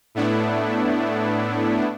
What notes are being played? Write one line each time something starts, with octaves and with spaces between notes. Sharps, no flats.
A2 A3 B3 D4 E4